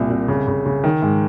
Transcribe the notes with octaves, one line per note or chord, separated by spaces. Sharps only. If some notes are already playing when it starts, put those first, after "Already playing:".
Already playing: C2 A#2
C2
C#3
C#3
C#3
D#3
G#2